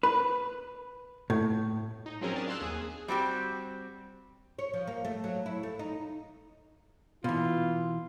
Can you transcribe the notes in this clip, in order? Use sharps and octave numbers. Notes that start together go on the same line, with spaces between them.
B4
A2
D#4
F3 F#3 C4 C#4 G#4 A#4
D4 G#4 A5
F5 C6 E6 F#6
D#2 G#4
G3 C4 F#4 G4
C#5
F3
A#3
A3
F#3
E4
A3
D#4
B2 E3 F4